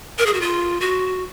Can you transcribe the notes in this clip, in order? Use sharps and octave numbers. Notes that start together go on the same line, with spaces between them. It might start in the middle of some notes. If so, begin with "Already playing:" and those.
A#4
G#4
F#4
F4
F#4